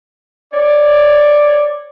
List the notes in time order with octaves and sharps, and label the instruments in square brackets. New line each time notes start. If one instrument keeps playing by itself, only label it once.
[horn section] C#5 D5